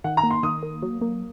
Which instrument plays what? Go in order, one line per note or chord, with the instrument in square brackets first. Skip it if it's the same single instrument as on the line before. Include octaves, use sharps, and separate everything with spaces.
[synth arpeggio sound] D#3 [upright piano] F#5
[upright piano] A#5
[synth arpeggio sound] A#3
[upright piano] C6
[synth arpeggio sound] D#3 [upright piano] D#6
[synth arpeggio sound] A#3
F#3
A#3